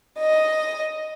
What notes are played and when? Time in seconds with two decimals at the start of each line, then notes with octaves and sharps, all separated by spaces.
0.19 D#5